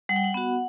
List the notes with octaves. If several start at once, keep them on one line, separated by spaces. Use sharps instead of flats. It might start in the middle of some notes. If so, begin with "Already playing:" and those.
G3 F#5
G5
F#5
B3 F#4